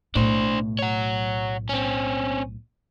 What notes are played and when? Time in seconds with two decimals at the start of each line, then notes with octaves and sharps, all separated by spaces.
0.15 B1 A2 D4 C5
0.79 C#5 F#5
1.69 C4 C#4